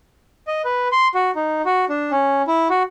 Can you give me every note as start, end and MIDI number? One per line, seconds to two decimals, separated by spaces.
0.47 0.62 75
0.64 0.88 71
0.92 1.08 84
1.14 1.31 66
1.35 1.62 63
1.65 1.85 66
1.89 2.11 62
2.11 2.42 61
2.47 2.68 64
2.70 2.83 66